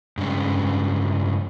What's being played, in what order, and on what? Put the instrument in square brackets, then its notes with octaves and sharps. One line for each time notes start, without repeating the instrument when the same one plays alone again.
[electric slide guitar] G2 C#3 G#3